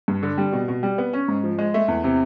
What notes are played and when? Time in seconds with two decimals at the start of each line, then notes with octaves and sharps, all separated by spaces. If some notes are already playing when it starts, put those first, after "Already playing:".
0.08 G2
0.23 D3
0.38 G3
0.53 B2
0.68 B2
0.83 G3
0.98 B3
1.13 C#4
1.28 G#2
1.44 F3
1.58 G#3
1.74 A3
1.88 E2
2.04 C3